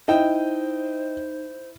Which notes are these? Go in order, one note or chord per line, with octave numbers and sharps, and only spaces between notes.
D#4 E4 C5 D#5 G5